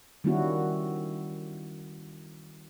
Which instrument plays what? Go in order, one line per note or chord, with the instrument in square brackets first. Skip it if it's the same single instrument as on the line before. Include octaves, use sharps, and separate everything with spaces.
[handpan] D#3 G3 A#3 C#4 E4 F#4